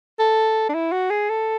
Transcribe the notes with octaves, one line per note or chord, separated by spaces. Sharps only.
A4
D4
E4
F#4
G#4
A4